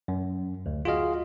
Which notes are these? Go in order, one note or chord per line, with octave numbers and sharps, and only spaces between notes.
F#2
D2
F4 F#4 G#4 D#5 F5